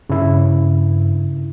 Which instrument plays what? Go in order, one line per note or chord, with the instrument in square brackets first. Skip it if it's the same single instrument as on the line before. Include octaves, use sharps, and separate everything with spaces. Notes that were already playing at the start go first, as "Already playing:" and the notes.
[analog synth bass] G2 [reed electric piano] C#3 E4